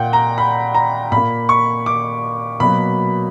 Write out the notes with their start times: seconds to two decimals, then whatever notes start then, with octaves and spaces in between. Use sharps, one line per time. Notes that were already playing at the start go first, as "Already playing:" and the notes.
Already playing: A#2 A#3 F#5 G5
0.13 A#5
0.38 B5
0.74 A#5
1.12 A#2 A#3 B5
1.49 C#6
1.86 D6
2.60 B2 F#3 A#3 B5